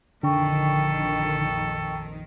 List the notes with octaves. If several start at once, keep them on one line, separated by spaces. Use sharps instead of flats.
A#1 F2 D3 D#3 A4 G5 C#6